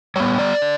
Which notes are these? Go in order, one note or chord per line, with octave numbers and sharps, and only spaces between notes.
G3 B3 C#5
D5
D3